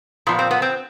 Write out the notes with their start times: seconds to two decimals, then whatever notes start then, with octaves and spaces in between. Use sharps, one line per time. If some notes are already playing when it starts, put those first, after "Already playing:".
0.27 A#2 F3 B3
0.39 C4
0.51 B3
0.62 C4